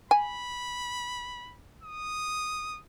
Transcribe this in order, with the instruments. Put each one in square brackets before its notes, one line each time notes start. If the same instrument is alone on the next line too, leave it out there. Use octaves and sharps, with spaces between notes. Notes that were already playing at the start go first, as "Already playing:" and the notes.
[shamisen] G#5 [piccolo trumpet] B5
[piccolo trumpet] D#6